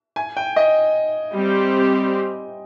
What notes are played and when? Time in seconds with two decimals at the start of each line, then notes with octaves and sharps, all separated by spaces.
0.16 G#5
0.37 G5
0.56 D#5
1.34 G3 C4 G4